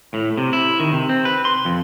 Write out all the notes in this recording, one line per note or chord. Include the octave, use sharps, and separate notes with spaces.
A2
C3
E4
D#3
C3
C4
B4
C6
F2